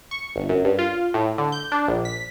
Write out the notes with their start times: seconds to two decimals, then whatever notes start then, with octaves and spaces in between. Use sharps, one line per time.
0.11 C#6
0.36 G1
0.49 F#2
0.65 G2
0.79 F4
1.14 A2
1.38 D3
1.52 G6
1.72 D4
1.88 A#1
2.05 B6